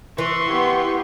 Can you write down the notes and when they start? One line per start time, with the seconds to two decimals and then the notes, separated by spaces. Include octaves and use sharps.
0.18 E3 C6 C#6
0.48 B3 G4